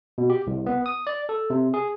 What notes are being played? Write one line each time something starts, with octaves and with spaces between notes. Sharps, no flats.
B2
G4
C2
B3
D#6
D5
A4
C3
G#4